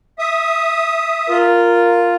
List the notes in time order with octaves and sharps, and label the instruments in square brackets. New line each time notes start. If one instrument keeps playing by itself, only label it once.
[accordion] E5 D#6
[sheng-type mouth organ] F4 [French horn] A#4